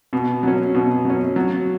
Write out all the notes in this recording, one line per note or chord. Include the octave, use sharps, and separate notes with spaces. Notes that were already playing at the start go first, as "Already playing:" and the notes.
B2
F#3 C#4
B2
F#3 C#4
F#3